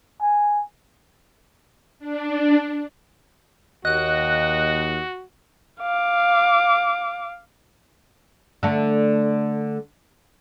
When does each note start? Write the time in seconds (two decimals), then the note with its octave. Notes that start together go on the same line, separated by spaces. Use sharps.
0.21 G#5
1.99 D4
3.85 D#2 F#4 D#5 F#6
5.81 F5 D6
8.63 D3 A3